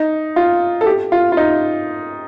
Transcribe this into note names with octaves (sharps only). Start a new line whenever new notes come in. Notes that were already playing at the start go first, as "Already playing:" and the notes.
Already playing: D#4
F4
A4
G4
F4
F4
D#4